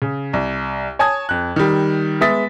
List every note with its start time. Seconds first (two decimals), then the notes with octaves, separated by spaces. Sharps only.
0.02 C#3
0.33 C2
0.99 C#5 G#5 A5 D#6 G#6
1.29 F2 F#6
1.56 D#3 G3
2.21 G#3 B3 E5 D#6 A6 B6